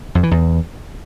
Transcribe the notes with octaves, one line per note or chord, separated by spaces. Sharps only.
F2
E3
E2